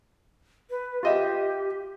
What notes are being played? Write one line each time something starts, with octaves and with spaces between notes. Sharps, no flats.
B4
F4 G4 D#5 E5